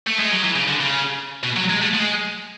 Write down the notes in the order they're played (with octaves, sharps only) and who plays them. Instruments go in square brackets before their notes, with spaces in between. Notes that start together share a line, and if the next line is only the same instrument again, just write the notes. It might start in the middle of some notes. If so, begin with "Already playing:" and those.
[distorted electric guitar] A3
G#3
F#3
E3
C#3
D3
C#3
B2
F#3
G#3
A3
G#3